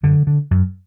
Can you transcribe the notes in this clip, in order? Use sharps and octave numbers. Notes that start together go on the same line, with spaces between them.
F#2 D3
D3
F#2